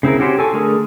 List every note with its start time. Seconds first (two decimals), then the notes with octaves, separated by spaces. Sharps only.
0.03 C#3 C4 E4 A#4
0.19 C#4 F#4 G4 C5
0.39 A4 G#5 C#6
0.53 D3 A3 G#4 A#4